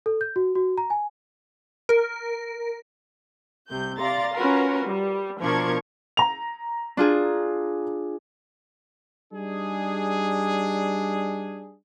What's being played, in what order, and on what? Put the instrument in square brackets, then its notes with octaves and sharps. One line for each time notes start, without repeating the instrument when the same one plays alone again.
[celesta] A4
G6
F#4
F#4
A#5
G#5
[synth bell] A#4
[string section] C2 C3 G6
D5 F5 A#5 C6 A6
C#4 F4 F#4 A#4 B4
G3
B2 F3 D4 A#4 C#6 G#6
[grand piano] A#5 F7
[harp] D4 F4 G#4
[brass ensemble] G3 D4 D#4 G#4